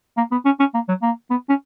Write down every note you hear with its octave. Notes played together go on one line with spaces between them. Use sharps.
A#3
B3
C#4
C#4
A#3
F#3
A#3
B3
C#4